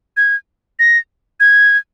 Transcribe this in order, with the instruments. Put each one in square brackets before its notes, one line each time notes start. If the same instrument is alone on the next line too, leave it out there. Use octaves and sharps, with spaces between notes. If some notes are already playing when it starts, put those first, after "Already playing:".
[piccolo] G#6
A#6
G#6